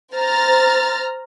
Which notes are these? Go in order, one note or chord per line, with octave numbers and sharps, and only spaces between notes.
C5 A#5 F6 A6